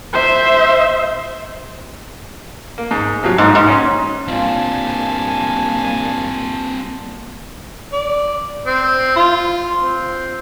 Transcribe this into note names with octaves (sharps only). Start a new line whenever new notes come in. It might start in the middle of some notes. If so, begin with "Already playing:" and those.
C5 E5
A#3
G#2
C3 F3 F#3
A#1 G#2 F#6
G#2
C#4
A#2 G3 A#3 C4 D4 F4 G#5 A5
D5
C4
F4
C4